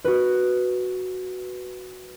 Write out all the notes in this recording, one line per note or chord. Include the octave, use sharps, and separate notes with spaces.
F#4 B4